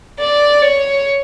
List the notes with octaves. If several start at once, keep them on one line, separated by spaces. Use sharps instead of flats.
D5
C#5